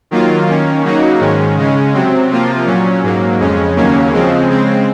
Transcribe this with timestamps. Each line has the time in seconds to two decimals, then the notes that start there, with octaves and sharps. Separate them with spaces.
0.11 D#3 F#3 A#3 F4
0.47 D#3 A#3 C#4
0.83 C#3 F#3 A#3 D#4 F#4
1.20 G#2 D#3 G#3 C#4
1.57 C#3 G#3 C#4
1.94 C3 F#3 C4
2.29 C3 F3 A#3 F4
2.66 A#2 F#3 C#4
3.03 G#2 F#3 A#3
3.40 F2 C#3 G#3 C#4
3.76 D#2 C#3 F#3 A#3 C#4
4.13 C#3 F3 G#3 C4
4.49 C#3 G#3 C4